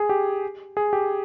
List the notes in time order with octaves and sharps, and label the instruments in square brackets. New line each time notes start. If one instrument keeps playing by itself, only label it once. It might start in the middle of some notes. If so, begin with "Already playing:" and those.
Already playing: [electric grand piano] G#4
G4
G#4
G4